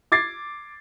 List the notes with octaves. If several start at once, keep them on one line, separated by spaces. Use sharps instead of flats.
D6 G#6 A6 C7